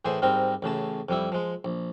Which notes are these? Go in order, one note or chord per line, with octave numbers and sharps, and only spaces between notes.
A2 E3 G#4 C5 G#5
G#2 G3 C4 A#4
A1 A2 C#3 A5
F2 G3 E4
F3 G#3
A#1